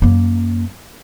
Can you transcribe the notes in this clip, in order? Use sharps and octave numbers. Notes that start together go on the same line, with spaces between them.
F#2 A#3